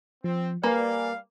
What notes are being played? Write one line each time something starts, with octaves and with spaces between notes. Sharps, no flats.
F3 C4
G3 A#3 B4 D5 F5 G#5